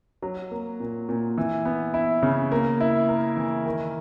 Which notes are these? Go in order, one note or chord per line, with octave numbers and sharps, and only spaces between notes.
F#3
A#3
A#2
A#2
E3
B3
E4
C#3
A#3
E4
A#4
E3
D#3